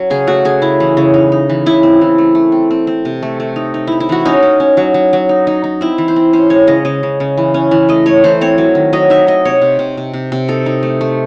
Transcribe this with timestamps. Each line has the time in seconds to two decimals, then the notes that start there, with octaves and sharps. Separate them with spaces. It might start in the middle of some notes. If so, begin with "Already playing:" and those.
Already playing: F#3 C#4
0.10 C#3 G#4
0.27 A3 F#4
0.45 C#3 G#4
0.62 C#3 E4
0.80 E3
0.97 C#3
1.14 D#4
1.32 D#4
1.49 E3
1.66 C#3 E4
1.83 C4
2.01 E3
2.18 A3
2.35 A3
2.52 C4
2.70 C4
2.87 C4
3.05 C3
3.22 A3
3.40 A3
3.56 D#4
3.74 D#4
3.87 D#4 E4
4.00 E4
4.09 E3 F#4
4.25 C#4 D#4
4.42 C#4
4.60 C#4
4.77 F#3
4.94 F#3
5.13 F#3
5.29 D#4
5.47 D#4
5.64 D#4
5.81 C4 E4
5.98 E3
6.08 C5
6.16 C4
6.33 C#4 C5
6.50 G#3 C#5
6.67 C#3 D#5
6.85 C#3 D#5
7.03 C#3
7.20 C#3
7.37 E3
7.54 C#4
7.71 E3
7.89 A3 D#5
8.06 A3 C#5
8.24 E3 C5
8.41 C4 C#5
8.58 F#3
8.75 D#3
8.93 F#3 D#5
9.10 D#4 E5
9.27 D#4 D#5
9.45 C3 C#5
9.62 C3
9.79 C3
9.97 C3
10.13 C3
10.32 C3
10.48 D#4 A4
10.66 D#4
10.83 A3
11.01 A3